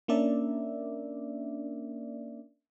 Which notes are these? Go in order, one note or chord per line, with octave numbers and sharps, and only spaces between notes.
A#3 C#4 D4 A#4 D5 E5